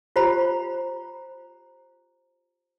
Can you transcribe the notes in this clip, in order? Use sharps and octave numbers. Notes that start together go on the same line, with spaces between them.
F4 G4 C5 A#5 B5